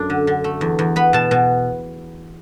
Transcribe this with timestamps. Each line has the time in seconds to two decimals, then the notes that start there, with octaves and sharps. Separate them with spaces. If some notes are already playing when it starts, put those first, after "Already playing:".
Already playing: F#2 A3 D4
0.10 D3
0.27 D3
0.44 A3
0.61 E2
0.79 E2
0.96 B3 B5
1.13 B2 A5
1.31 B2